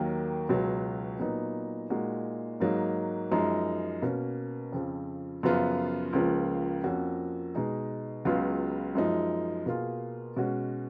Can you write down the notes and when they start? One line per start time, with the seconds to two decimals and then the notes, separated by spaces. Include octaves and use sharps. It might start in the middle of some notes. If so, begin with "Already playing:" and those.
Already playing: D#2 D#3 F#3 A#3
0.49 C#2 B2 F#3
1.19 A#2 F#3 B3 D#4
1.90 A#2 G#3 D#4 F#4
2.60 G#2 F#3 A#3 D#4
3.32 F#2 F3 G#3 D#4
4.02 B2 A#3 C#4
4.72 F2 C#3 F3
5.43 F#2 C#3 F3 B3 F4
6.13 C#2 C#3 F3 A#3
6.84 F2 F3 A#3 C#4 F#4
7.55 B2 G#3 D#4 G#4
8.25 C#2 C#3 F#3 B3 F4
8.95 F#2 F3 G#3 D#4
9.66 B2 A#3 F4 G#4
10.36 B2 G#3 C#4 F#4